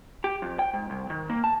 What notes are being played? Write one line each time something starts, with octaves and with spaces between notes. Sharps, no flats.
G4
F2
G5
G#2
C2
D#3
A#3
A5